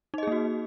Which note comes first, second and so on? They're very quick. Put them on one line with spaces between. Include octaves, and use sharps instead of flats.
D#4 D#5 G#4 A#3 F#4